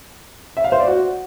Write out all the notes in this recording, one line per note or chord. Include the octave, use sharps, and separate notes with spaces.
E5
F5
C5
D5
F#4